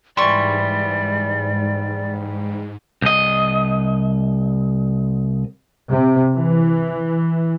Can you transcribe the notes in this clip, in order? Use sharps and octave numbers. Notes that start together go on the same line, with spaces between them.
G#2 E3 G3 D5 C6 C#6
C2 D#5
C3
E3